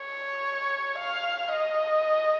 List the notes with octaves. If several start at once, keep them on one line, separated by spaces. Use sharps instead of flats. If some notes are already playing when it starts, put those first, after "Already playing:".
Already playing: C#5
F5
D#5